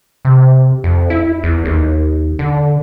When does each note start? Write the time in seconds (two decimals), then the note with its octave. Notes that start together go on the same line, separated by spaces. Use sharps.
0.25 C3
0.84 F2
1.10 E4
1.44 E2
1.65 D#2
2.39 D3